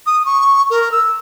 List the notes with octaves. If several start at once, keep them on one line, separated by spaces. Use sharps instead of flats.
D#6
C#6
A#4
E6